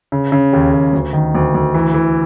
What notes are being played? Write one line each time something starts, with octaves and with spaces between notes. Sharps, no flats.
C#3
C#3
D#2
D#2
D2
D#3
D2
D2
E3
E3